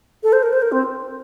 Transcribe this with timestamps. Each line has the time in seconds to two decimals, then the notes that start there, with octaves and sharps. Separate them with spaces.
0.23 A4
0.33 C5
0.43 A#4
0.53 C5
0.62 A#4
0.72 C4